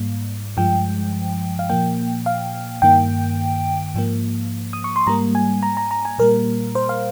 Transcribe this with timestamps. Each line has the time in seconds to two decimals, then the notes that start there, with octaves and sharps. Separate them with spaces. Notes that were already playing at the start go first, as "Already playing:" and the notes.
Already playing: G#2 G3 A#3
0.57 G2 F3 G#3 G5
1.59 F5
1.70 A#2 F3 A#3 G5
2.26 F5
2.82 G2 D#3 A#3 G5
3.94 G#2 F3 A#3
4.73 D#6
4.84 C#6
4.96 C6
5.07 G#2 G3 A#3 A#5
5.35 G#5
5.63 A#5
5.77 A#5
5.91 A#5
6.05 G#5
6.19 A#2 G3 A#3 A#4
6.75 C5
6.89 F5